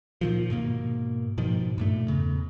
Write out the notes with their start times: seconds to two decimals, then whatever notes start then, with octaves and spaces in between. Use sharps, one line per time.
0.21 A#2 D#3 F3
0.50 G#2 B2 A#3
1.38 G#2 B2 D#3 F3
1.78 G2 A#2 A3
2.08 E2 C#3